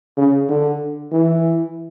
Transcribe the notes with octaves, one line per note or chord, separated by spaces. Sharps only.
C#3
D3
E3